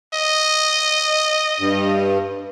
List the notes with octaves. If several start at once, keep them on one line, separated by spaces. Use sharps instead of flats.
D#5
G2